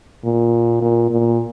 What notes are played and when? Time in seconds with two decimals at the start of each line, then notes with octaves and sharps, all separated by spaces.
0.24 A#2
0.82 A#2
1.11 A#2